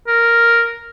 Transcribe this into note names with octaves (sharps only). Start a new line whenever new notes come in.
A#4